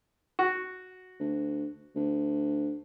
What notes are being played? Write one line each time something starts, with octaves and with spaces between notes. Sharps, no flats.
F#4
D2
D2